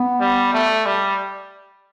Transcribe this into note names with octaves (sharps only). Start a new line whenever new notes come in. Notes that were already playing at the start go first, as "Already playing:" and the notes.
Already playing: B3
G3
A3
G3